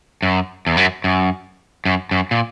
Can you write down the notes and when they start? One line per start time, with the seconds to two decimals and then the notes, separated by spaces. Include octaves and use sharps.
0.22 F#2
0.67 E2
0.77 F#2
1.04 F#2
1.85 F#2
2.11 F#2
2.31 A#2